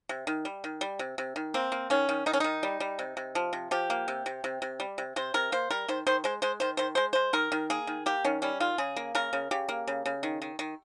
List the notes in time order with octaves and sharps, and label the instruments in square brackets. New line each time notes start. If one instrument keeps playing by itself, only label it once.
[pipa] C3
D#3
G3
D#3
G3
C3
C3
D#3
A#3 C4
A#3
D#3 C#4
D#3
D#3 D#4
C#4
D#3 D#4
G3
G3
C3
C3
F3
C3
F3 G4
A#3
C3
C3
C3
C3
G3
C3
C3 C5
C3 A#4
A#3 C5
G3 A#4
D#3 C5
D#3 C5
G#3 C5
G#3 C5
D#3 C5
D#3 C5
G#3 C5
G#3 C5
D#3 A#4
D#3
A#3 G#4
D#3
A#3 G4
D#3 C#4
G3 C#4
D#3 F4
C#3 G#4
A#3
C#3 A#4
C#3
C#3 G4
A#3
C#3
C#3
D#3
D#3
D#3